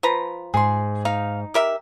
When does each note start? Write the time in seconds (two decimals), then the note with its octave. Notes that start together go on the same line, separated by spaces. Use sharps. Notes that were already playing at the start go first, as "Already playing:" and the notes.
0.03 F3 B4 A#5
0.54 G#2 G#4 C6
1.05 D#4 F5
1.54 G4 A#4 E5